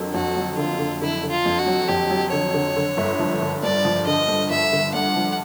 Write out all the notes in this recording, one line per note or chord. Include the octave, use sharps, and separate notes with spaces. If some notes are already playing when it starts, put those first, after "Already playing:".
Already playing: F2 D3 F#3 A#3
F2 F#4
F#3
D3 F4
D3
D3 E4
D3
F4
F2
F#4
F#3
F2 G4
F#3
D3 C#5
D3
D3
G1
F3
G1
G2 D5
F3
D3 D#5
G2
G1 E5
D3
G2 F#5
F3